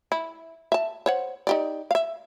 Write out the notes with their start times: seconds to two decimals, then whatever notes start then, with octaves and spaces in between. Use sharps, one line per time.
0.12 E4
0.72 E5 A5
1.06 C5 C#5 F#5
1.47 D#4 G4 D5
1.91 E5 F5